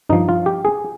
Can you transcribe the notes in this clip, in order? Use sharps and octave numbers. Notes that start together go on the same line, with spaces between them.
G2 F3 D#4
F4
G4
G#4